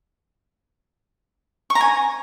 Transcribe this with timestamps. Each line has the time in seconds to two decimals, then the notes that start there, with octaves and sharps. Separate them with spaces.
1.70 C#6
1.75 A#5
1.81 G#5